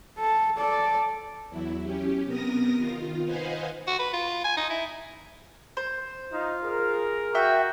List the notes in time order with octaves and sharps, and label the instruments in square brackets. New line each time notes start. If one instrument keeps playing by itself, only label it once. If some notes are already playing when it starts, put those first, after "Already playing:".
[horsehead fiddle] A4
A4 D5
[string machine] E2 F#3 E4
C#4 G4
C3 B3 A#4 D#6 A#6
D#3 F4
B4 C5 D#5 F5 F#5 G#5
[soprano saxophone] F#4
B4
F4
G#5
D#4
E4
[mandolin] C5
[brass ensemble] D#4 [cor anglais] F4
[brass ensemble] G#4 A#4
[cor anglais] F#4 [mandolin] E5 G5